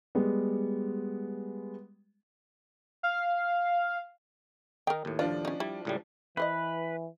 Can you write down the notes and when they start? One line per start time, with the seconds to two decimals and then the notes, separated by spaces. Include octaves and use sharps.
0.15 G3 G#3 B3
3.03 F5
4.87 D#3 D#4 A#4 G5
5.05 D#2 A2
5.19 F3 D4 F4
5.45 C#4 D#4
5.60 G3 E4
5.85 C#2 A2 G3
6.37 E3 E4 B4 C5 D#5